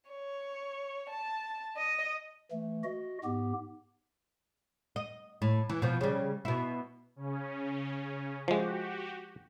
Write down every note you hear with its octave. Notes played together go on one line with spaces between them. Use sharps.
C#5
A5
D#5
E3 A3
F#4 D#5
G#2 B3 G4
D#5
A2
E3
B2 F3
C#3 G3
B2 E4
C#3 C#4
F3 G#3 F#4 G4